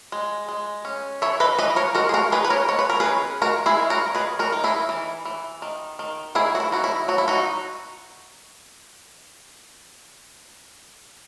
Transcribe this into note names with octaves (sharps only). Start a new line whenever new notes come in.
G#3
G#3
C#4
E3 C#5 E5
B4 D#5
E3 B4 D#5
A#4 C#5
G#3 F#4 A#4
G#4
F#4 A#4
D#4 G#4 B4
B4
A#4 C#5
G#3 C#5
B4
A#4
G#4 B4
C#4
G#3 F#4 A#4
E4 G#4
G#3
F#4 A#4
D#3 G#4 B4
F#4 A#4
D#4
E4 G#4
E3
E3
D#3
D#3
D#3 E4 G#4
F#4
E4
D#4 F#4
E4
F#3 F#4
E4
D#4 F#4